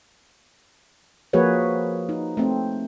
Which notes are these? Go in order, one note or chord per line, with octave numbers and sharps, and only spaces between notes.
F3 A#3 F#4 G#4 B4 C#5
D#4
A3 C4